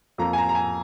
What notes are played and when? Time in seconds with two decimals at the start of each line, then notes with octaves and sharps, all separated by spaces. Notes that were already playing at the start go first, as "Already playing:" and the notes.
0.18 F2 F3 A#3 A#5
0.33 G#5
0.38 A#5
0.49 A#5
0.55 G#5